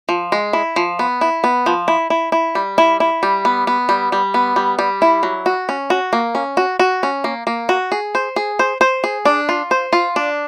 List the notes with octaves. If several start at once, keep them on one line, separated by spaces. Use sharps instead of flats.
F3
G#3
E4
F3
B3
E4
B3
F3
E4
E4
E4
G3
E4
E4
G3
B3
B3
G3
G3
B3
G3
G3
E4
F#3
F#4
C#4
F#4
A#3
C#4
F#4
F#4
C#4
A#3
A#3
F#4
G#4
C5
G#4
C5
C5
G#4
D4
F4
C5
F4
D4